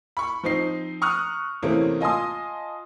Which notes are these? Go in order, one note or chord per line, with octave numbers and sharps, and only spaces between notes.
B5 C#6
F3 C4 D#4 C7
A#5 C#6 D#6 F6 F#6
C3 E3 A3 A#3 C4 C#4
F4 D#5 G#5 A5 C6 D#6